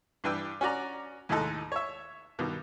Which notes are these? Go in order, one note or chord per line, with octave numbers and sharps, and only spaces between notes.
G2 E3 D4 B4 G5 E6
C#4 F#4 D5 A#5
D#2 A2 G#3 D#4 A4 F#6
C#5 E5
G2 B2 D#3